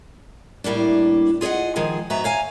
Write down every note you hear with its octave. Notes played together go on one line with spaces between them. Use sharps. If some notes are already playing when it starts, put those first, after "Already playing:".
A2 G3 A#3 D4
F4 G#4 C#5 D#5 F#5
D#3 F3 G#3 G#4
G#2 B3 F#4 E5 A#5
C#5 F5 G#5 A#5